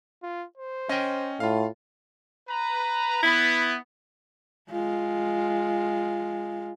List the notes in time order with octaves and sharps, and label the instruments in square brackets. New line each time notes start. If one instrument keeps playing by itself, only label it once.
[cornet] F4
C5
[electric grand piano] C#4 [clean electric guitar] D#5 G5
[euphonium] A2 [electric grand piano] F4 F5
[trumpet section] B4 A#5
[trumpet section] B3 [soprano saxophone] E4
[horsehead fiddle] G#3 F4